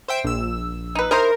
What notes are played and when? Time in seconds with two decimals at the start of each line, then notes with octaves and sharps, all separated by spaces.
0.08 C5 E5 G5
0.24 A#1 E6
0.95 D#4 B4
1.11 D#4 E4 A#4 C5